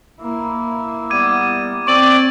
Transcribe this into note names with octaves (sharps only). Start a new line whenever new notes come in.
A#3 E4
G3 B3 D6 G#6 D#7
C4 D5 C#6 D7 F#7